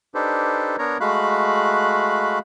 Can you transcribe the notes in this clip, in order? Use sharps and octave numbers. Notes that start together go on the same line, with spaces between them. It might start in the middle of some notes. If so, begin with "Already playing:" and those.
D4 D#4 G4 A4 B4 C5
B3 D4 A#4 C#5 A#5
G#3 A3 F#4 F5 B5 F#6